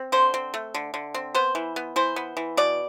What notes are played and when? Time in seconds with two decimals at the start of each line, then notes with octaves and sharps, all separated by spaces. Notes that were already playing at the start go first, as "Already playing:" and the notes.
Already playing: C4
0.12 D3 C5
0.34 C4
0.54 A3
0.74 D3
0.94 D3
1.14 C4
1.35 B3 C5
1.55 E3
1.76 B3
1.96 E3 C5
2.16 B3
2.37 E3
2.57 B2 D5